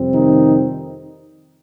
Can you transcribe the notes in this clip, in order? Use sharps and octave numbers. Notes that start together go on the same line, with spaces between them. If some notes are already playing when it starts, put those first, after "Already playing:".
Already playing: F2 C3 G3 C4
D#3 D#4